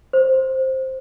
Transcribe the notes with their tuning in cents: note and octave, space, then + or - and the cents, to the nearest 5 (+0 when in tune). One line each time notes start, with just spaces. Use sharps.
C5 +10